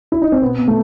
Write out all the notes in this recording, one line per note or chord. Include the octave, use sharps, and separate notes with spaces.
E4
D#4
C4
B2 B3
B2
A3